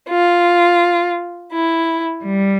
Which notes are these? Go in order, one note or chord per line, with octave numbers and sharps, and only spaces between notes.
F4
E4
G3